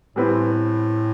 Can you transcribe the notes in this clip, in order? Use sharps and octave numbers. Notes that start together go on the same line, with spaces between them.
A2 E3 G3 C4 E4 B4